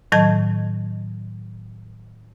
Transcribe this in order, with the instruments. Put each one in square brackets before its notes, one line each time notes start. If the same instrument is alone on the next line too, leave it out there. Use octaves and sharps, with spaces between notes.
[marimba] A2 D#3 F#3 D#5 A5 G#6